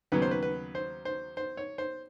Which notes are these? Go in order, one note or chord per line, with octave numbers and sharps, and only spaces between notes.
D#2 C#3 F#3 B3 B4
C5
B4
B4
C5
C5
C5
C#5
C5